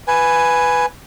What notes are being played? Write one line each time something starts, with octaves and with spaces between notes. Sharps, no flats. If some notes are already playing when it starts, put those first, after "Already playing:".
B4 G#5